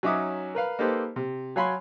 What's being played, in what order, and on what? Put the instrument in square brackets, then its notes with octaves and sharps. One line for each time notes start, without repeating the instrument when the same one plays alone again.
[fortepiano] F#3 C#4 D#4 E5 D6 D#6
A#4 B4 F5
A#3 D#4 G4 A4 B4 C5
C3
F#3 C#5 F5 G#5 B5 C6